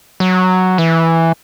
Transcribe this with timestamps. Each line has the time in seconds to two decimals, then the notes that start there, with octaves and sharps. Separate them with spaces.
0.20 F#3
0.78 E3